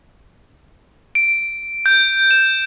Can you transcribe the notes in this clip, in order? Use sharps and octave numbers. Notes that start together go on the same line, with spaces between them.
D7
G6
E7